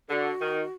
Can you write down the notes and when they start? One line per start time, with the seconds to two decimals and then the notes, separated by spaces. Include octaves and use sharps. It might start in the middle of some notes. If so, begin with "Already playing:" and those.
0.09 D3 G#4
0.13 F#4
0.41 D#3